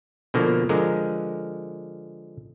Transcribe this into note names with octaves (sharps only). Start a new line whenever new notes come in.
B2 D3 F3 A#3
D3 F3 G#3 A#4